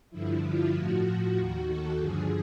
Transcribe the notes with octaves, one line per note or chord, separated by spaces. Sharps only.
G2 D3 F3 E4
F4
A2 F3 F#4
D#2 D#3
A4
G2 D3 F3 G#4